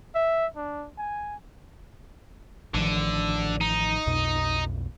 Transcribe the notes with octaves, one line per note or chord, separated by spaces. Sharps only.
E5
D4
G#5
A1 D3 D#3 F3
D#4
B1 F2 B2